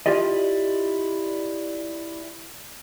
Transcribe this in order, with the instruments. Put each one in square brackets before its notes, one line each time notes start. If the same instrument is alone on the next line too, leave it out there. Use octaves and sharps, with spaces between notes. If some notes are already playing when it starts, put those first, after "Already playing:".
[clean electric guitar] E4 F4 G4 D5 D#5